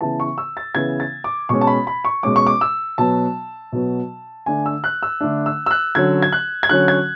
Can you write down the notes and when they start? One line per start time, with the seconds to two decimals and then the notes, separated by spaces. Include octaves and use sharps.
0.01 C#3 E3 B3 A5
0.20 C#6
0.38 E6
0.57 A6
0.75 C#3 E3 B3 G#6
1.00 A6
1.24 D6
1.49 B2 G#3 C#4 C#6
1.61 A5
1.67 B5
1.87 B5
2.05 C#6
2.23 B2 G#3 C#4 D6
2.36 C#6
2.47 D6
2.61 E6
2.98 B2 F#3 B3 A5
3.72 B2 F#3 B3
4.46 D3 A3 D4 G#5
4.66 E6
4.84 F#6
5.03 E6
5.21 D3 A3 D4
5.46 E6
5.66 E6
5.71 F#6
5.95 D3 F#3 C#4 G#6
6.22 G#6
6.32 F#6
6.63 G#6
6.69 D3 F#3 C#4 F#6
6.88 G#6